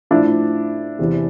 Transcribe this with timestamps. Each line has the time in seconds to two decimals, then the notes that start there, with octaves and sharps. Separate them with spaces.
0.11 A2 F3 D4 E4
0.99 E2 C3 E3